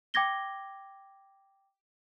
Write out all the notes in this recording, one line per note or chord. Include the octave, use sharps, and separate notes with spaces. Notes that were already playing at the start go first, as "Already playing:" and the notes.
G5 D6 G#6 A#6 G7